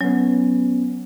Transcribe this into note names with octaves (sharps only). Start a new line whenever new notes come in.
F#3 B3 C#4